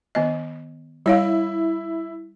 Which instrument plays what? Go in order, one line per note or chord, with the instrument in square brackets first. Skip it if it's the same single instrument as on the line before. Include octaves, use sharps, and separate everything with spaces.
[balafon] D#3 B3 D#5
[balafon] G3 C#5 F5 [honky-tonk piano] E4